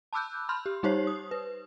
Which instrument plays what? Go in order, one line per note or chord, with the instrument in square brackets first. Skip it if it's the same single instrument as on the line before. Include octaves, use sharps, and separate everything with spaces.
[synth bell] A5 B5 D6 E6 F#6 G6
B5 C6 F6 G6
G4
G3 D#4 G4 C5 C#5 C7
D#6
B4